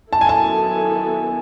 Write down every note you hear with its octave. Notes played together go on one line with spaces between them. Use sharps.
D#3 F#3 B3 E4 A4 A5
G#5
A5